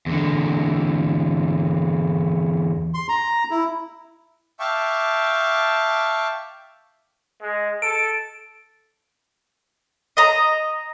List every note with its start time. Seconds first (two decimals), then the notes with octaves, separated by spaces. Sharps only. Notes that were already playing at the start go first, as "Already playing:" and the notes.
0.06 E2 D3
2.94 C6
3.09 A#5
3.50 E4
4.60 E5 F5 G5 A5 C#6 D6
7.42 G#3
7.82 A4 D7
10.17 D#5 A#5